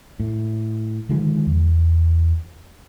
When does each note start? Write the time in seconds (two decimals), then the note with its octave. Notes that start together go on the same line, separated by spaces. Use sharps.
0.20 A2
1.09 D3 D#3 F3 G#3
1.47 E2